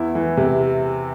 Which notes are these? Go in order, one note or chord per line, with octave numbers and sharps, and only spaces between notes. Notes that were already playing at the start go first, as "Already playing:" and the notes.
Already playing: E2 E4
E3
C3